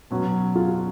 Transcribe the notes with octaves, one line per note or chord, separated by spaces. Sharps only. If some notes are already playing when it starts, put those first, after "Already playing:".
B2 F#3 C#4 F#4
F4